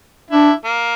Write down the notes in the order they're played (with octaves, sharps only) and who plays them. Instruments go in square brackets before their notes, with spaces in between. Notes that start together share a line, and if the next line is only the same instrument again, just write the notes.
[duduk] D4 [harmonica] E4
[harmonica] A#3